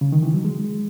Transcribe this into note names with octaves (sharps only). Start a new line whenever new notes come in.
C#3
D#3
E3
F#3
G#3